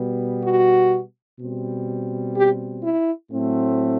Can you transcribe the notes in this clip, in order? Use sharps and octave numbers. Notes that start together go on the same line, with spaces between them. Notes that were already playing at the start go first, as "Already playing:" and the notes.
Already playing: B2 G3 B3
F#4
B2 G3 C4
G4
E4
A2 F#3 A3 C4